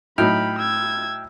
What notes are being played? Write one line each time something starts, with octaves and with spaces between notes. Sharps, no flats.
A2 F#3 D#4 G5 B5 F6
E6 G#6